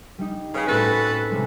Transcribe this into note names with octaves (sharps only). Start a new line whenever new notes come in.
G3 D#4
C#3 G#4 B4
A2 C4 C#4 F#4 A4 B4
C3 G3 G#3